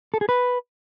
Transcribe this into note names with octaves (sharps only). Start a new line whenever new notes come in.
A4
G#4
B4